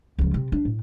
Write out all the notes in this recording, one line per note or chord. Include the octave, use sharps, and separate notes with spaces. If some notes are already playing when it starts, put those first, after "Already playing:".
C#2 F3
C3
D4
A2